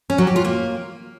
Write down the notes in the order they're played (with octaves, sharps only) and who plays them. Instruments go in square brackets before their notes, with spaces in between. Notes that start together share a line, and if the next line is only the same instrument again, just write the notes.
[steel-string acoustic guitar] C#4
F#3
G4
F4
A#3